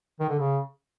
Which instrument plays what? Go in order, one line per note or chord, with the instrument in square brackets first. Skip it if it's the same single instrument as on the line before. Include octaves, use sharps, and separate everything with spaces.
[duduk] D#3
D3
C#3